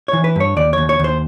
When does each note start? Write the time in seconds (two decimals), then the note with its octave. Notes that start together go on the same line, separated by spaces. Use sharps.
0.08 E3 C#5
0.24 B4
0.36 G2 C#5
0.56 D#2 D5
0.73 D#2 C#5
0.89 C#5
0.99 D#2 C5